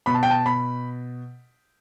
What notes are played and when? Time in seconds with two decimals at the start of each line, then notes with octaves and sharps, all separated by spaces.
0.06 B2 B5
0.14 A5
0.23 G5
0.30 A5
0.46 B2 B5